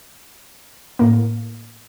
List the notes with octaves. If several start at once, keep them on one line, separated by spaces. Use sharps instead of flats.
A2 A#3